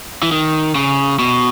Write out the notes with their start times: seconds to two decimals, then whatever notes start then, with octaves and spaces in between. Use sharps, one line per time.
0.22 E3
0.32 D#3
0.75 C#3
1.19 B2